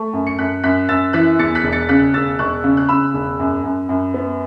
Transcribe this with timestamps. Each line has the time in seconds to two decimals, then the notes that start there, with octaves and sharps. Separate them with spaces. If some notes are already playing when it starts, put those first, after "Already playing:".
Already playing: A3 C#6
0.14 F#2
0.27 C#7
0.39 F#2 F#6 B6
0.64 F#2 F#6 B6
0.89 F#2 E6 A6
1.13 E3 F#6 B6
1.39 E2 A6 C#7
1.55 F#6 B6
1.64 E1
1.72 A6 C#7
1.89 C#3 F#6 B6
2.14 E1 E6 A6
2.39 E1 C#6 F#6
2.64 C#3
2.77 F#6
2.89 C#3 B5 E6
3.14 E1
3.40 F#2
3.64 F#2
3.89 F#2
4.14 B3